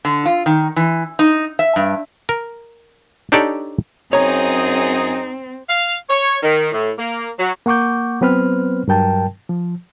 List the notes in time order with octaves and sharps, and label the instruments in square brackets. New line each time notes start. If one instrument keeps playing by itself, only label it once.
[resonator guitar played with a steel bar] D3
F4
D#3
E3
D#4
E5
G2
[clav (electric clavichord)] A#4
D4 D#4 G4 A4 C#5 D5
[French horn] F#2 [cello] C4 [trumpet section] D#4 G#4 [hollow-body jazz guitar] C#5 A#5
[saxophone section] F5
C#5
D#3
A2
A#3
F#3
[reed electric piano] A#3 F#5 C#6 D6 G6
F#3 B3 C4 B4 C5 F6
G2 F#3 A#4 G5 A5
F3